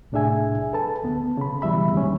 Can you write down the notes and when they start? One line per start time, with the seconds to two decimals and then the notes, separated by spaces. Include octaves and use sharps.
0.12 C2 A2 D4 G#4 E5 G#5
0.73 A4 B4 A5
1.04 D2 B3
1.37 C#3 B5
1.62 D#2 B2 E3 G3 E5 B5
1.93 D#2 G3 G#3 C#4